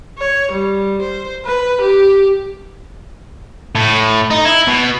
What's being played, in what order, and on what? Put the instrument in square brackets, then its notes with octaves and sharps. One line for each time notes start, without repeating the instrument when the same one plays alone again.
[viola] C#5
G3
C5
B4
G4
[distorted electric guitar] A2
D#4
E4
B2